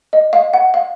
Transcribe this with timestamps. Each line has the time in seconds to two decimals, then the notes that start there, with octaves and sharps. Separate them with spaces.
0.13 D#5
0.33 F5
0.54 F#5
0.74 F5